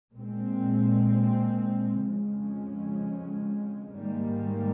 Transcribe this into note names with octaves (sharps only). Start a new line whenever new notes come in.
A#2 G#3 C4
F2 C#3 F3 G#3 C#4
G#2 D#3 G3 A#3